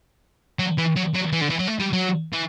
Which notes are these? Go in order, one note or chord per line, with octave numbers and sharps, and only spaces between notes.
F#3
E3
F#3
F#3
E3
D3
E3
F#3
A3
G3
F#3
E3